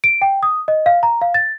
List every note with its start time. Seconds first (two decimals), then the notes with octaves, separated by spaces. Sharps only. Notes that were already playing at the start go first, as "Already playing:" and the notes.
0.04 D7
0.22 G5
0.43 D#6
0.68 D#5
0.86 F5
1.03 A#5
1.22 F5
1.34 A6